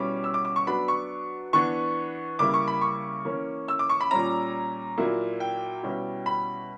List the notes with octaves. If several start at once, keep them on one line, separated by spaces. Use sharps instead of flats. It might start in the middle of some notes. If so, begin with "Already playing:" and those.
Already playing: B2 G3 C#4 E4 D6
E6
D6
D6
C#6
F#3 B3 D4 B5
C#6
E3 B3 D4 C#6
C#3 G3 A#3 E4 D6
C#6
B5
C#6
E3 A#3 C#4
E6
D6
C#6
B5
A#2 G3 C#4 A#5
A#2 F#3 A#3 E4
G5
B2 G3 C#4 E4
B5